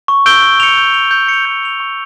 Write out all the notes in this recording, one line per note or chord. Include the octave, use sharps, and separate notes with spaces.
C#6
E6 G6 D7 G7
G6
C#7 F7
G6
C#7 F7
G6
C#7 F7
G6
C#7 F7
C#6